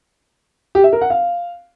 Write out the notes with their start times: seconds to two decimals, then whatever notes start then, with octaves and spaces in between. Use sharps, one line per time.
0.75 G4
0.84 E5
0.93 A#4
1.01 F#5
1.10 F5